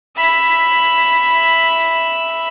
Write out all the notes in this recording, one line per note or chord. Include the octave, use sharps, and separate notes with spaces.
E5 B5